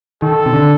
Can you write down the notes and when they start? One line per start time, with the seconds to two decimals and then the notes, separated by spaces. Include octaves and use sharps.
0.22 D#3 A4
0.46 C3
0.53 D3